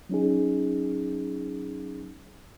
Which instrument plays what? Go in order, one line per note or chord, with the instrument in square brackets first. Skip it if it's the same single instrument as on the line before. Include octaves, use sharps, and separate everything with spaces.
[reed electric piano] F#3 C#4 D#4 G#4